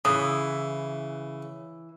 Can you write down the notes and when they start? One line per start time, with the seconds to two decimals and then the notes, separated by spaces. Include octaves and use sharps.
0.05 C#3 E3 D#6